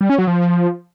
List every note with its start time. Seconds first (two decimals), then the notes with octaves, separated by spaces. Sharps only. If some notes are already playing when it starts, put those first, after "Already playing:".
0.01 G3
0.10 C#4
0.18 F#3
0.27 F3